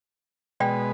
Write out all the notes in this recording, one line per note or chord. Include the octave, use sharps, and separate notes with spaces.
B2 G#3 B4 D5 G5